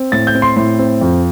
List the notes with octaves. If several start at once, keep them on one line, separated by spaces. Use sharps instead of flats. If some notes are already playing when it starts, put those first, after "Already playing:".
Already playing: C4
A2 A6
G6
C4
C6
A2 C6
C4
F2